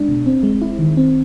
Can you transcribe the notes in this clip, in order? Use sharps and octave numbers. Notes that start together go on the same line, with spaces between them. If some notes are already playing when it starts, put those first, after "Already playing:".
Already playing: G#3 D4
B2
C4
G#3
E4
D#3
C4